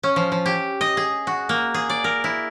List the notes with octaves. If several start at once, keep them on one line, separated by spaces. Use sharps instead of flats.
C#4
F3
F3
G4
D#5
G#4
F#4
A#3
G#4
D5
A#4
E4